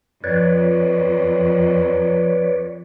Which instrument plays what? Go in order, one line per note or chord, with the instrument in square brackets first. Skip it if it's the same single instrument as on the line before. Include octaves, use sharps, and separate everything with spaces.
[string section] F2 [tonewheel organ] B4 C#5 D5